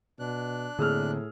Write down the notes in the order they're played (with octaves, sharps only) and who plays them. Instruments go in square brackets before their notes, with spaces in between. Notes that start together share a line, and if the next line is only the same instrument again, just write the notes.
[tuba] B2 [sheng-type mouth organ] D4 F#6
[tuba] A2 [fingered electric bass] D3 A#3 C4 [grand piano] G#4 E6 F6